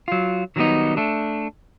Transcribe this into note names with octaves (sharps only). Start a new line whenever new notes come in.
F#3 F4
D#3 F#3 G3 A#3 B3 D#4
A3 D4